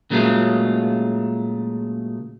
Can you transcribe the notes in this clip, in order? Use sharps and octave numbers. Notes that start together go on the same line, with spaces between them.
A#2 C#3 F#3 G#3 A3 F4